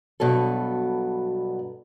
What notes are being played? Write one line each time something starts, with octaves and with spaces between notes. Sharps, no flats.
G2 B2 F#3 A4